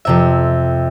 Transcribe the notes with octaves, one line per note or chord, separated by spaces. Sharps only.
F2 C3 E5